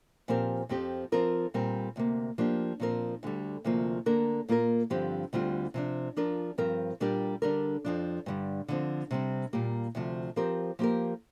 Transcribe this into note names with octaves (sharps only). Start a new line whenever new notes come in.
A#2 F3 C4 G4 A#4
F2 F3 C4 G4
F3 C4 F4 A#4
A#2 G3 C4 A#4
D2 C3 A#3
F3 A#3 D4 G4
A#2 F3 C4 A#4
D2 D3 G3
D2 C3 F3 A#3 F4
D3 A#3 D4 A#4
A#2 A#3 F4 A#4
G2 D3 F3 C4 G4
D2 D3 G3 C4 F4
C3 F3 D4
F3 D4 F4 A#4
G2 F3 C4 A#4
A#2 G3 D4 G4 A#4
D3 G3 D4 A#4
F2 F3 D4
G2 D3 G3
D3 F3 C4
C3 G3 C4
A#2 G3 A#3 G4
D2 C3 F3
F3 C4 G4 A#4
F3 A#3 G4 A#4